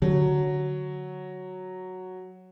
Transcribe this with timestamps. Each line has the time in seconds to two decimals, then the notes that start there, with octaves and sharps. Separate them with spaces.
0.02 D3 F#3